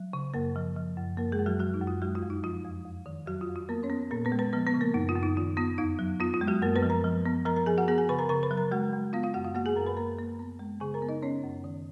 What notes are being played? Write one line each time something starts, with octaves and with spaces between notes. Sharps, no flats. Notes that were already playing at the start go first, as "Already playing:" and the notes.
Already playing: F#3
C#3
F#2 A#3 A#4
F3
F3
F#2
F#2 A#3 A#4
G#3 G#4
F#2
F#3 F#4
F#3 F#4
D#4
F#2
F4
F#3 G#3 F#4
F4
F2
D#4
F3 F4
F2
F2
D#3
F2 F#3 F#4
F4
F2
F4
A#3 B3 A#4
C#4 C#5
B3
A#2 A#3 A#4
B3 B4
G#3
B3 B4
F3 B3 B4
B3 B4
C#3
A#3 A#4
F#2 D#4
F4
F#2
D#4
D#3 F4
B3 F4
F2 D#4
F#3
B3 F4
F4
G#3
F#3 F#4
F#2 A#3 A#4
B3 B4
F3
A#4 A#5
F3
B3
F3 A#4 A#5
A#4 A#5
F3 G#4 G#5
F#4 F#5
B3 G#4 G#5
G#4 G#5
C#3 B4 B5
A#4 A#5
C#3 A#4 A#5
B4 B5
F#3
A#4 A#5
G#3 F#4 F#5
G#3
B3 F4 F5
F4 F5
F#2 F#4 F#5
F4 F5
A#3 F#4 F#5
G#4 G#5
F#2 A#4 A#5
B4 B5
A#3 A#4 A#5
A#3
B3
G#3
C#3 G#4 G#5
A#4 A#5
B3
D#4 D#5
B3 C#4 C#5
F#2
D#3